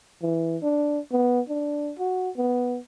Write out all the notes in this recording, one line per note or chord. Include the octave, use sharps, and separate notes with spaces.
E3
D4
B3
D4
F#4
B3